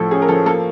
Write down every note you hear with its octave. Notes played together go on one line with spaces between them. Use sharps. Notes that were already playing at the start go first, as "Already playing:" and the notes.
Already playing: A2 F3 A4
C#4 G#4
A#4
F3 A4
A#3 A4